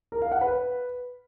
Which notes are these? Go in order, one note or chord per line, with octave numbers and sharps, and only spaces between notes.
A#4
F5
F#5
B4